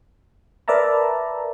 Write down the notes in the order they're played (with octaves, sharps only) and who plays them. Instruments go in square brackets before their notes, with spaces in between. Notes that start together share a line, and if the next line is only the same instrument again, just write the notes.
[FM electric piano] A#4 B4 D5 E5 A5 A#5